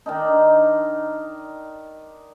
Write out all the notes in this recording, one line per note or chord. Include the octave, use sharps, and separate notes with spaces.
D#3 D4 D#4